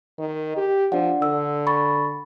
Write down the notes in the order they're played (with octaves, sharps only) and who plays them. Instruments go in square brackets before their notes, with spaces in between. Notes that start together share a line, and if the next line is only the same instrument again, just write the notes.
[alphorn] D#3
G4
[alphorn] F3 [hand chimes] D4 D5 F#5
[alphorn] D3 [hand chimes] E6
[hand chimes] B5 C#6 A6